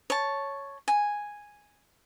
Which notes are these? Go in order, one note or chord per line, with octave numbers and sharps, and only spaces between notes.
C#5 A5
G#5